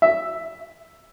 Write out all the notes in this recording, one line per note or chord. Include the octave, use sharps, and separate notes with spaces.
E5